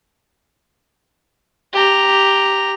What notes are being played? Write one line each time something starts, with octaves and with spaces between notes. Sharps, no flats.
G4 A#5